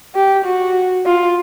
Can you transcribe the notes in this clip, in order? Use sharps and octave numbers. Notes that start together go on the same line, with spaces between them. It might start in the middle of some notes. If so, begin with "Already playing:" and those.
G4
F#4
F4